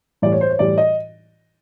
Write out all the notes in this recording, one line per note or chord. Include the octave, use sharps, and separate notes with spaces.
A2 E3 G3 D5
C#5
C5
C#5
A2 E3 G3 D5
D#5